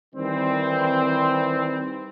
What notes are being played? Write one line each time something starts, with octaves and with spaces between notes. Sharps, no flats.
D#3 E3 G3 C4